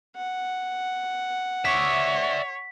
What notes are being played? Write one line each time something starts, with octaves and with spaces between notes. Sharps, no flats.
F#5
C#5 D5 E5 B6